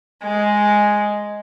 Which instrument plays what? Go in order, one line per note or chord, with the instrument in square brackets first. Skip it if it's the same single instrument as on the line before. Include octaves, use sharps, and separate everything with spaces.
[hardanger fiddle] G#3